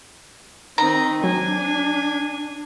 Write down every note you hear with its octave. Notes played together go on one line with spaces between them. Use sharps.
D#3 C4 D#4 A#5
F#3 D4 G#5